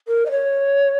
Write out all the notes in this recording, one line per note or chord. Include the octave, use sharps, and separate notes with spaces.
A#4
D#5
C#5